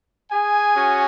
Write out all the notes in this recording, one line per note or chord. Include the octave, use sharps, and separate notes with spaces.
G#4 G#5
C#4 F#4